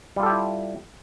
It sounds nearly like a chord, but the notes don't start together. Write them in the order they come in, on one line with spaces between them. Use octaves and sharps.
G3 F4 A4 G4 E4